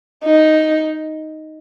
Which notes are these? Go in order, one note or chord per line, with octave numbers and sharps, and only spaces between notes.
D#4